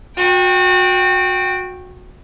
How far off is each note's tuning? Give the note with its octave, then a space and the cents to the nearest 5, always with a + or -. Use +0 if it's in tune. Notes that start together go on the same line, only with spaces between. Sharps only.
F#4 -25 G5 +0